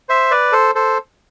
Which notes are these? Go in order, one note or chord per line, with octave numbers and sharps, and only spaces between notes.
C5 E5
B4 D5
A4 C5
A4 C5